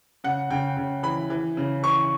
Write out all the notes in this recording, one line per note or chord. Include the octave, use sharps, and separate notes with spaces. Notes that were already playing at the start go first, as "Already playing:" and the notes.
C#3 F#5
C#3 G5
C#3
E3 B5
E3
C#3
E3 C#6